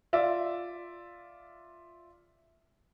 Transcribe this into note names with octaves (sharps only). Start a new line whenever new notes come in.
F4 D5 E5